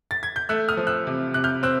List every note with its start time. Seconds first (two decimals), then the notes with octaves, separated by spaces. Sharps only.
0.11 A6
0.23 G#6
0.36 G6
0.49 A3 E6 F#6
0.69 D#6 F6
0.77 F3
0.87 E6 F#6
1.07 C3
1.34 C3 F#6
1.44 F6 G6
1.63 C4 E6 F#6